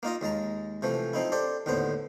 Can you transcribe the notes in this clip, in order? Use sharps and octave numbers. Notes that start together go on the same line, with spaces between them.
A#3 D#4 F4 D#5
D#2 G#3 A5 A#5
C3 E3 F3 A3
F3 C4 D#4 E4
D4 G4 A4 C5
D#2 A2 D3 B3 C5